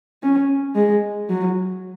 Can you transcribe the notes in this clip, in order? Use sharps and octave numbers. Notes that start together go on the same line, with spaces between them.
C#4
G#3
F#3